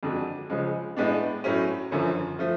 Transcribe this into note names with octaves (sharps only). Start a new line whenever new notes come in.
F2 D3 G#3 D4 F#4
C#2 C#3 F3 G#3
A2 G#3 B3 D4
A2 F#3 A3 C#4
G#1 F#2 D3 F3
F3 A3